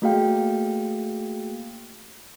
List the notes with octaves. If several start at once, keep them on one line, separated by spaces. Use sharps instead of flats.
A3 A#3 F#4 G#4 F5 G5